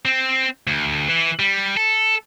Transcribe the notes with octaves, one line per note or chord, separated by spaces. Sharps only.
C4
D2
E3
G3
A4